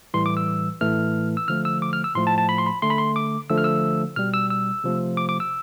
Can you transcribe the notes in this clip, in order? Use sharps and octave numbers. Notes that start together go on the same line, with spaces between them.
A2 E3 G3 C6
D6
E6
A2 E3 A3 F6
E6
D3 F3 A3 F6
E6
D6
F6
E6
A2 F3 A3 C6
A5
A5
B5
C6
B5
D3 A3 C6
B5
C6
D6
D3 F3 A3 E6
F6
E6
B2 G3 F6
E6
E6
C3 F3 A3
D6
D6
E6